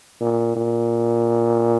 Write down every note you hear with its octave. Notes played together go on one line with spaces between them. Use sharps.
A#2
A#2